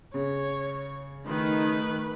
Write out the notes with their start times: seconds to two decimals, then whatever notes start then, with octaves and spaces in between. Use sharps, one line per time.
0.14 C#3 C#5
1.27 D#3 A3 B4